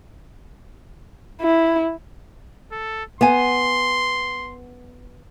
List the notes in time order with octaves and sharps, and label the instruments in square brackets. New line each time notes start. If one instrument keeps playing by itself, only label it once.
[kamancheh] E4
[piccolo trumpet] A4
[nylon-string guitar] B3 G#5 [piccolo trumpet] C6